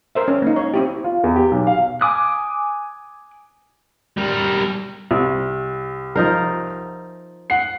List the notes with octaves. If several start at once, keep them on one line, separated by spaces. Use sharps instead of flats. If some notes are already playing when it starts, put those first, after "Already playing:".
A#4 C5 E5
C#4
A#3 D#4
C#5
C4 E4 G4
F4
E2
G4
B1
F5
G#5 D6 D#6 F#6
G3 A#4
C2
F3 D#4 A#4
F#5 C7